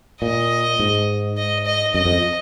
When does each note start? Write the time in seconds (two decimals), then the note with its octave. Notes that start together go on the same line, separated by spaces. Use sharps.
0.21 A#2 D#5
0.80 G#2
1.37 D#5
1.66 D#5
1.94 F#2 D#5
2.05 F2